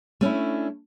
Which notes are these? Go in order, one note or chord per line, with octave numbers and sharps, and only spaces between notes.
A3 C#4 D4 E4